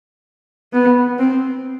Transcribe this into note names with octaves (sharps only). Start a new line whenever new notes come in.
B3
C4